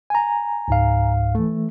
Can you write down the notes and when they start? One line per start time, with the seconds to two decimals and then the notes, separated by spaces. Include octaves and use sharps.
0.10 G#5 A#5
0.68 C#2 G#2 F5
1.35 E3 A3